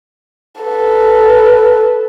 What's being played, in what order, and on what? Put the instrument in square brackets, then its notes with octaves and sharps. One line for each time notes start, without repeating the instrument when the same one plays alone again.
[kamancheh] A4 B4